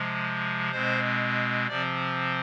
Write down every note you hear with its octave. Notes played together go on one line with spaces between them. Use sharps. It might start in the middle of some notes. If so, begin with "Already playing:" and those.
Already playing: C3 F3 G#3
B2 G#3 C4 C5
C3 F3 C4 D5